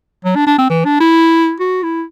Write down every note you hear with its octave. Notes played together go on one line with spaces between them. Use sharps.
F#3
D4
D4
C4
E3
D4
E4
F#4
E4